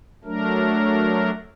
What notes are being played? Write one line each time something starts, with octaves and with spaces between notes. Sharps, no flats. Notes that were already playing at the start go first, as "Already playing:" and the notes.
F#3 A3 D4 A#4